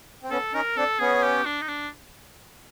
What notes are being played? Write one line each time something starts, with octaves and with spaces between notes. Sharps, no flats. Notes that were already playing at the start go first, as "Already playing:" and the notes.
C4
B3 C#4 A4
C#4 D#4 A#4
C4 D4 A4
B3 C#4 G#4
G4
D4
D#4
D4